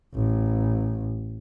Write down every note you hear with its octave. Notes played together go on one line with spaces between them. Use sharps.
A1